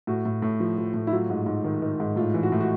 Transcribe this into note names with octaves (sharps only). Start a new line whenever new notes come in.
A2 F#4
A2
A2
F3
F3
A2
E4
F#3 F4
G#2
G#2
D#3
D#3
G#2
A2 F4
E3
F#4
A2
F#4